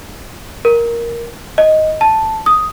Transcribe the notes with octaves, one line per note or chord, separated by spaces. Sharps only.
A#4
D#5
A5
D#6